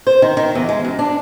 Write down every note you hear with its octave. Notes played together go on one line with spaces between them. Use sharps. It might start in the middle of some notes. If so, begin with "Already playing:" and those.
C5
D#3
D#3
E2
G#3
F#2
D4